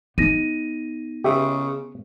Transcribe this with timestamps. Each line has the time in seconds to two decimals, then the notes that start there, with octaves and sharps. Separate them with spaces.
0.18 B3 D#4 A#6 D#7
1.24 C#3 G4 E5